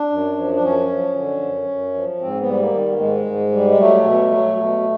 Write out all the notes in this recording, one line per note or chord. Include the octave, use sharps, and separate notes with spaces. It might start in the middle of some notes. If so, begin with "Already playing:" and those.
Already playing: D4
F#2
F3
D4
F#2 C#4
F3
D3
F#2
F#2
F3
G#2 C4
B3
G3
A#3
D#3
G#2 G#3
G#2
G3
G#3
F#3 A3
B2
F#3
B2